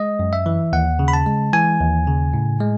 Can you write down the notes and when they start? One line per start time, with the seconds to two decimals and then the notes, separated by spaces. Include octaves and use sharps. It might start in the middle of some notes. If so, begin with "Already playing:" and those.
Already playing: G#3 D#5
0.19 F#2
0.33 E5
0.46 E3
0.73 D#2 F#5
0.99 C#3
1.08 B5
1.13 A5
1.26 G#3
1.53 E3 G#5
1.80 D#2
2.07 C#3
2.33 A2
2.61 G#3